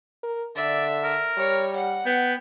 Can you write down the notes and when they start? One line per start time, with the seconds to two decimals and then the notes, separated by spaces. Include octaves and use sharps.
0.23 A#4
0.56 D3 D5 E5
1.04 A#4
1.37 G3 C#5
1.75 F#5
2.06 B3 G5